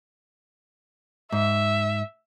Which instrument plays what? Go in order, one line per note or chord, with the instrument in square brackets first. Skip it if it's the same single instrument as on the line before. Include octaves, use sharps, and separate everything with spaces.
[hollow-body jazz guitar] G#2 [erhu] E5